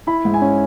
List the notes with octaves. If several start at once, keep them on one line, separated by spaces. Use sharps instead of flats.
E4 B5
G#2
G#5
C#4